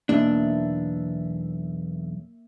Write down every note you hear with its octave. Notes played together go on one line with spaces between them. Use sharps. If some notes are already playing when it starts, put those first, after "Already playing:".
B1 E2 A#3 D4 E5